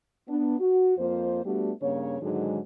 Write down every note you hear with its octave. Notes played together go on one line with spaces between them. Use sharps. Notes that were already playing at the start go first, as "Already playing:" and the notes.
B3 D4
F#4
F2 A#3 F4 C5
G3 A3 B3 D4 F#4 G4
G2 C#3 A#3 C#5
G#2 D3 D#3 F#3 G#3